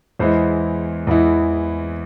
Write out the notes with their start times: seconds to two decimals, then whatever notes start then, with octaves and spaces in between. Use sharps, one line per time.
0.19 E2 E3 G#3 E4 C5
1.07 E2 E3 G#3 E4